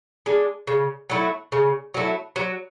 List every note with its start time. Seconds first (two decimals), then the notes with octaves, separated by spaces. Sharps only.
0.26 G#3 D4
0.67 C#3
1.10 F#3 A3 E4
1.52 C#3
1.94 F#3 A3 E4
2.36 F#3